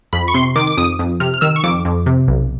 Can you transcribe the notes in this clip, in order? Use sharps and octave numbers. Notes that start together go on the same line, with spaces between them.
F2 B5
C#6
C3 C6
D#3 D6
D6
F2 D#6
F2
C3 F6
F6
D#3 E6
C#6
F2 D6
F2
C3
B1